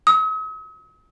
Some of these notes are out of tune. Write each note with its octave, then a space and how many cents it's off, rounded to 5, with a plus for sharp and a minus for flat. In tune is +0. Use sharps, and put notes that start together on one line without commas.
D#6 +45